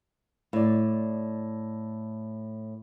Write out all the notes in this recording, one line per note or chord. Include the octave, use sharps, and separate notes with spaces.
A2 D5